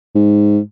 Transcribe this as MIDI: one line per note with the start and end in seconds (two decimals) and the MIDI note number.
0.15 0.59 44